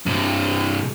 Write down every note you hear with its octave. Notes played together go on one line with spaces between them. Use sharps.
G2 C3